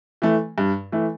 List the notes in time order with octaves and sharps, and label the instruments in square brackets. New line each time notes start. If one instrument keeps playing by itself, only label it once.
[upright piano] E3 A3
G2
E3 A3